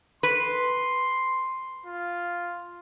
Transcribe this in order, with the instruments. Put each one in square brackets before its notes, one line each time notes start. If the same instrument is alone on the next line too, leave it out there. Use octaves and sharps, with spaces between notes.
[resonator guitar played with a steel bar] B4 [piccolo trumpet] C6
[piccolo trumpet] F4